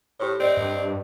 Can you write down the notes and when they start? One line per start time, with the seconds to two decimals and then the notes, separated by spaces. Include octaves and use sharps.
0.20 A2 G4 C5 C#5
0.40 C4 D5 D#5
0.57 G2